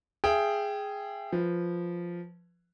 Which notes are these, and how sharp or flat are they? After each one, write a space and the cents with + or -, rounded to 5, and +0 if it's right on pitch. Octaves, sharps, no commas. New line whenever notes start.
G#4 +0 E5 +30 G5 +0
F3 +0 B4 +0